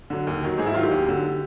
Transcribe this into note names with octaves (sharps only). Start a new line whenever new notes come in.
D3 F#3
D#2
D#3 F#3
G#2 G#4
E4
D#3 F#3 F4
G4
D#2
D3 F#3